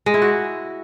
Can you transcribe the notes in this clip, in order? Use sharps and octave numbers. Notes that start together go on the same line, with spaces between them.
G#3
E4
F#4